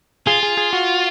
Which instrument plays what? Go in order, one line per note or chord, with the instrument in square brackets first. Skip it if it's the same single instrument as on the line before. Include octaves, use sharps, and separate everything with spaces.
[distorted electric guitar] F4 [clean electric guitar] G#4
[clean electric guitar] G#4
G#4
F#4